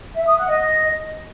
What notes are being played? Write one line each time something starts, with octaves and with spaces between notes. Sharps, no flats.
E5
D#6
F#5
D#5